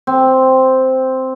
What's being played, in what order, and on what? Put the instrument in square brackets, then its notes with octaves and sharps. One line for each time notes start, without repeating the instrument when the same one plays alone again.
[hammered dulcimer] C4